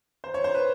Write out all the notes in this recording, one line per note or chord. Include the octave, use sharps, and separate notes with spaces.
C5
C#5
C5
B4